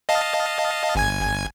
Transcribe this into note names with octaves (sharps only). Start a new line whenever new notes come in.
D#5 F5 A5
G1 G#5 G#6